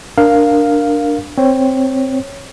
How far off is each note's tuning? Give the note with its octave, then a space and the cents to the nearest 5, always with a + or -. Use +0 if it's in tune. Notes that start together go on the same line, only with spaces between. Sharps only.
D4 +0 A#4 +0 F5 +0
C4 +0 C#5 +0